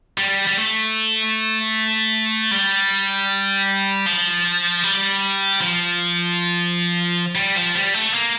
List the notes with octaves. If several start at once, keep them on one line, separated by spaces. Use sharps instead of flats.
G3
G3
A3
G3
F3
G3
F3
G3
F3
G3
A3
A#3